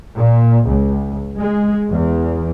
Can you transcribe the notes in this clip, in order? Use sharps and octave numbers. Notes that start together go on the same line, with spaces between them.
A#2
C#2
G#3
E2